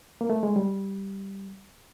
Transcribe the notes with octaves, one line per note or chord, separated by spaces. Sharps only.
A#3
A3
G#3
G3